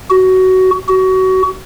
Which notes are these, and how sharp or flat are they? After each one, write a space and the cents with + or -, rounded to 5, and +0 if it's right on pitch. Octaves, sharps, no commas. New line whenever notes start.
F#4 +15
F#4 +25